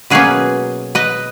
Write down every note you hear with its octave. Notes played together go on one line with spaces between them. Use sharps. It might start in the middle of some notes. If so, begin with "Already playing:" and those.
B2 F#3 A#3 C#4 G#4 B4
B4 D#5